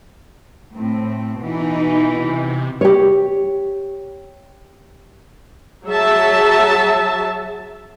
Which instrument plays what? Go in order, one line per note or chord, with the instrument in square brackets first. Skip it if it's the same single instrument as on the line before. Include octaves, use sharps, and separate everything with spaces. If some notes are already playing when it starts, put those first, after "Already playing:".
[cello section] A2 C4
[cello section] B2 E3 [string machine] D#4
[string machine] C3
[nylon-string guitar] G4 C#5
[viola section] F#3 G#4 E5 A5